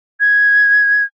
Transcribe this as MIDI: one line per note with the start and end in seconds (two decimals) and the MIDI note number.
0.20 1.03 92